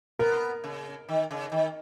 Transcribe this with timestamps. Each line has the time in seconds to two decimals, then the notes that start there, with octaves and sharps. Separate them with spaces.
0.19 B3 A#4
0.64 C#3
1.09 D#3
1.31 C#3
1.52 D#3